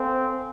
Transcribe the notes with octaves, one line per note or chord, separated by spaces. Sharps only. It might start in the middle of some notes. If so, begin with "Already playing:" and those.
Already playing: C4 A4 C5 F5 G#5